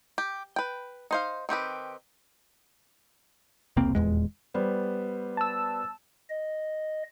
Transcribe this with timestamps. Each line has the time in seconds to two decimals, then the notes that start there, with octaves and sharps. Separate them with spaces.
0.18 G4
0.56 B4 G5
1.11 D#4 C5 F5
1.49 D#3 C4 G4 B4
3.77 E1 C2 A#3 C4
3.95 D#1 E2 G#3
4.54 G3 B3 C5
5.37 A5 E6
6.30 D#5